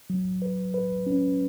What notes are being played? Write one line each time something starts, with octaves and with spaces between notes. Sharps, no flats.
F#3
B4
B4
C#4